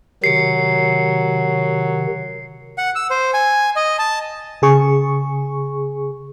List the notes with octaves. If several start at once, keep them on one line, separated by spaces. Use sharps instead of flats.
C3 D#3 F#3 C7 C#7
F#5
E6
C5
G#5
D#5
A5
C#3 G#4 C#6